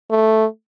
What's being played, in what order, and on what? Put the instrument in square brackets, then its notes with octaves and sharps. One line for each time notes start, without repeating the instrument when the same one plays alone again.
[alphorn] A3